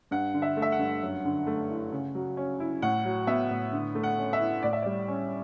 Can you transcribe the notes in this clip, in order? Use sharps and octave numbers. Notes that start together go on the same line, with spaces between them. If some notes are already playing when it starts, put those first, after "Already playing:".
G2 F#5
D3
E5
A3
E5
F#5
G2
F#2
D3
A3
E4
C#3
F#3
C#4
E4
A2 F#5
F#3
B3 E5
A2
D3
A3
F#5
C#4
E5
E4
A2 D5
E5
G3 D5
C#4